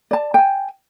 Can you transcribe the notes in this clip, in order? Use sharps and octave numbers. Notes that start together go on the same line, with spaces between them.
D5 A5
G5 G#5